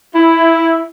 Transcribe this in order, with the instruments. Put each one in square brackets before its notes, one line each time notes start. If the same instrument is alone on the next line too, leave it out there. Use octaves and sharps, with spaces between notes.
[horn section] E4